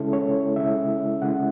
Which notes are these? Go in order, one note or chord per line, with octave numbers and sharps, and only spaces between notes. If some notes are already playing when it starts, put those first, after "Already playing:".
Already playing: C#3 G#3 C#4 E4 A4
C#5
C#3 G#3 C#4 E4 E5
C#3 G#3 C#4 E4 F#5